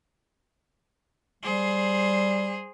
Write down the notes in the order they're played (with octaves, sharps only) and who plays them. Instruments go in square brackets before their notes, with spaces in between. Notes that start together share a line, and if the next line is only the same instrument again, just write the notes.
[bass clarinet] G3 [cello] G#4 C5